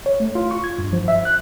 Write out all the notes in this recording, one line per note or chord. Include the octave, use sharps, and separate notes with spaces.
C#5
A3
F4
C#6
G#6
G2
F3
E5
F#6